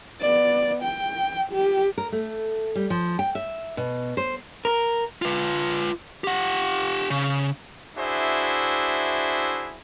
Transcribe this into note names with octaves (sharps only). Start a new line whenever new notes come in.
B3 D5
G5
G4
A#4
A3
G3
F3
G5
E5
B2
C5
A#4
F4 B4
G4 F#5
C#3
D4 E4 F#4 G#4 C5 E5